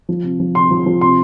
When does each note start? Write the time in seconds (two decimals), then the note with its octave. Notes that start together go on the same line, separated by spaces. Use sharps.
0.09 F3
0.24 C3
0.40 F3
0.55 C3 C6
0.71 F3
0.86 F3
1.01 C3 C6